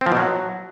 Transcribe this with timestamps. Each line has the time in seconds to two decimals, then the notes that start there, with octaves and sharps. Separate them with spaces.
0.01 C4
0.06 F3
0.12 B2
0.17 F#3